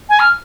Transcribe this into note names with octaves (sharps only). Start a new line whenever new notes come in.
G#5
F6